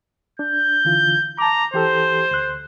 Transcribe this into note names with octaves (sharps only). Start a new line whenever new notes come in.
D4 G6
D3 E3 F4
A5 A#5 D6
E3 G4 A4 C5
D2 F#6